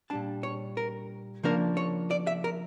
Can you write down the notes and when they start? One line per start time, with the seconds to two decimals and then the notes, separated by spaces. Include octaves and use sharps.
0.10 A#2 G3 D4 A5
0.43 C#5
0.77 A#4
1.43 C#3 F3 A#3 D4 A#4
1.77 C#5
2.11 D5
2.27 E5
2.44 A#4